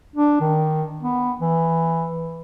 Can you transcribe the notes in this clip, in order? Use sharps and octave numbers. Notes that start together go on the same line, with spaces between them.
D4
D#3
B3
E3